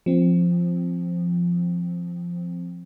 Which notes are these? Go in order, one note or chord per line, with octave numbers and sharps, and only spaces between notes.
F3 C4